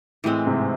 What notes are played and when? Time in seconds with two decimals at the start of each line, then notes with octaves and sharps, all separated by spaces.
0.24 A2 E3 G#3 C4
0.47 G#2 C3